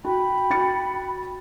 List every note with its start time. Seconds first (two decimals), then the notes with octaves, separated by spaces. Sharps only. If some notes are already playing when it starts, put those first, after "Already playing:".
0.04 F#4 G5 B5
0.50 F#4 A6 C#7